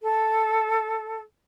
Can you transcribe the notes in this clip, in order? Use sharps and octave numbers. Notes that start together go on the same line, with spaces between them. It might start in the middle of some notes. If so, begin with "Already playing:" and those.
A4